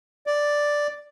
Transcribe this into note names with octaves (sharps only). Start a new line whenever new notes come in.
D5